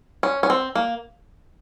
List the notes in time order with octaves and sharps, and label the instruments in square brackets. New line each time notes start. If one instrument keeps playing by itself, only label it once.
[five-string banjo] C#4
C#4
C4
A#3